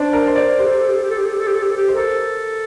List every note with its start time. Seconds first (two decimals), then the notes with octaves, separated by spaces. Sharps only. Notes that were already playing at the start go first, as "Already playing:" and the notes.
Already playing: D4 C5 D5
0.13 A#4
0.27 C5
0.36 D5
0.59 G4 C5
0.65 A4
0.74 G4
0.80 A4
0.88 G4
0.96 A4
1.02 G4
1.10 A4
1.18 G4
1.25 A4
1.33 G4
1.39 A4
1.47 G4
1.54 A4
1.62 G4
1.70 A4
1.77 G4
1.88 C5
1.95 A4 A#4